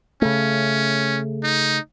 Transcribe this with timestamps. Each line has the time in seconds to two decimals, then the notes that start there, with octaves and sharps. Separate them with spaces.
0.22 C#3 A3 C#4
1.43 D#4